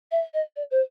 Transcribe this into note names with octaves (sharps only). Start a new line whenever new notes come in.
E5
D#5
D5
C5